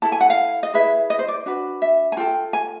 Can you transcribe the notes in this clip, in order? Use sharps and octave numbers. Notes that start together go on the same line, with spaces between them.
E4 A4 A5
G#5
F#5
F5
D#5
E4 G#4 B4 E5
D#5
C5
D5
D4 F#4 B4
E5
G#5
F4 A4 G5
G#5